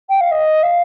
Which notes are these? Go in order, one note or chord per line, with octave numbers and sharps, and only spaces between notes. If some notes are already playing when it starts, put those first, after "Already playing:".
G5
F5
D#5
F5